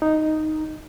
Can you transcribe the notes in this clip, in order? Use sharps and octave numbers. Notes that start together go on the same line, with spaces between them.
D#4